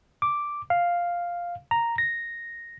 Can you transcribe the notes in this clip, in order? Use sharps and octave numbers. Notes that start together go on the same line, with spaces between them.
D6
F5
A#5
A#6